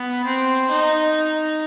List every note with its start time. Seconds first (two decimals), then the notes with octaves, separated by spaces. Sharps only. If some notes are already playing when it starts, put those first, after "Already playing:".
Already playing: B3
0.25 C4
0.71 D#4